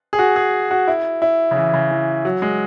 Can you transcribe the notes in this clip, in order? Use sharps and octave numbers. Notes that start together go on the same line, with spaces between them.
G#4
F#4
G#4
F#4
E4
E4
C#3
E3
C#3
E3
F#3
G#3